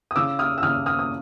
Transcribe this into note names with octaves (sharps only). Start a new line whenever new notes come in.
D#6
C#3 D6 E6
D#6 F6
E6
C#3 D#6 F6
D#6 F6
D#6